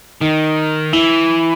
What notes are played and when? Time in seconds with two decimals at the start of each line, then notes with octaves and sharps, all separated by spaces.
0.21 D#3 D#4
0.93 E3 E4